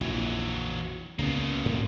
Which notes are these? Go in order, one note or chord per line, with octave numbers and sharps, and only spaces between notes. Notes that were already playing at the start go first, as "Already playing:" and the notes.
A#1 F2 E3 F#3
C#2 C#3 A#3 B3
G#2